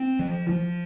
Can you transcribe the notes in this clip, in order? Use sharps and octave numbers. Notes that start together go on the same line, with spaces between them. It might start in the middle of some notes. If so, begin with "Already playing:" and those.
Already playing: C4
F3
F3